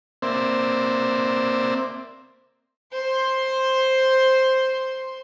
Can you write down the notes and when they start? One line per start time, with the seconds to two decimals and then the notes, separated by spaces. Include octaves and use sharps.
0.22 A#3 C4 C5 D5 E5
2.92 C5 C6